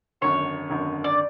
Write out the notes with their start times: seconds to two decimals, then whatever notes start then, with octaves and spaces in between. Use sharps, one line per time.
0.21 G#1 F#2 D3 C#5
0.69 G#1 F#2 D3
1.04 D5